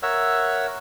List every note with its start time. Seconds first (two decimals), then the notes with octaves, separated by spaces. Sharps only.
0.03 A#4 C#5 E5 F#5 E6